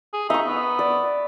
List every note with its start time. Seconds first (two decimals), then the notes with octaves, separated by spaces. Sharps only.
0.14 G#4
0.30 D#4 E5 C#6
0.47 B3
0.79 D5